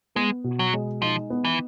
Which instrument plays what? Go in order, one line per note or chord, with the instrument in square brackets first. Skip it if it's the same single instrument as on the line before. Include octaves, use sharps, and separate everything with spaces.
[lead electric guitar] G#3 [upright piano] B3
[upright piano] B2
[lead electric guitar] F#3
[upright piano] G#3
[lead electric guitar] F3 [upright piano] D#4
[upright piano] B3
[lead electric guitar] E3